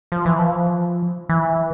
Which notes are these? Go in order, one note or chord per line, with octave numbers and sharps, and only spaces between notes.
F3
E3
F3
E3